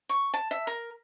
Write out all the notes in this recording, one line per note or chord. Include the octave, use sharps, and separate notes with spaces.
C#6
A5
E5
A#4